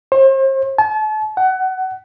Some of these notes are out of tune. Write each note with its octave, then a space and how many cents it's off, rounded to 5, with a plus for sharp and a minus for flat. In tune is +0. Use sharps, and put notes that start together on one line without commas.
C5 +40
A5 -40
F#5 +20